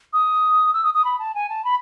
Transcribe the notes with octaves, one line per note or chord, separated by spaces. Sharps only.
D#6
E6
D#6
D#6
B5
A5
G#5
A5
B5